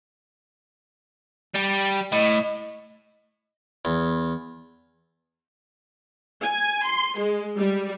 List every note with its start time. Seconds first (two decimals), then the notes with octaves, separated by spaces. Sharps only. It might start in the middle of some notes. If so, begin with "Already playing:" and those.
1.55 G3 G4
2.12 A2 D#5
3.85 E2
6.42 G#5
6.86 C6
7.18 G#3
7.57 G3